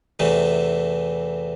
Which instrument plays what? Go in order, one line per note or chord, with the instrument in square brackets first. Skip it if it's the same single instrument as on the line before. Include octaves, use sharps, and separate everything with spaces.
[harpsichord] E2 C3 E3 A3